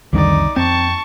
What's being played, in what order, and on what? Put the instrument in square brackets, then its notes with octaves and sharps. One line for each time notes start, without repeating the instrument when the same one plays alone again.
[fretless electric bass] C2 D3 G3 [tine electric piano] F2 D#3 [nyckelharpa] D#4 D5
[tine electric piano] F2 G5 [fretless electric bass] C4 [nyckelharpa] A5 C#6